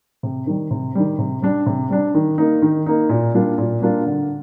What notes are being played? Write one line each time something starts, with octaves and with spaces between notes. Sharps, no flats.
C3
D#3 G3
C3
D#3 G3
C3
G3 D4
C3
G3 D4
D#3
A#3 D#4
D#3
A#3 D#4
A#2
G3 A#3 D4 F4
A#2
G3 A#3 D4 F4
D3